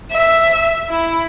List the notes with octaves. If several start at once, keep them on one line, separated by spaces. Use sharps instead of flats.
E5
E4